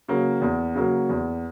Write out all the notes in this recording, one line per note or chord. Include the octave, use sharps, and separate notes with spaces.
C#3 F#3 A#3
E2
C#3 F#3 A#3
E2